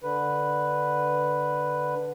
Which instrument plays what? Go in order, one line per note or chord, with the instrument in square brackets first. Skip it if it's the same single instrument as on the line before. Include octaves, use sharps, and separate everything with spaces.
[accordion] D3 B4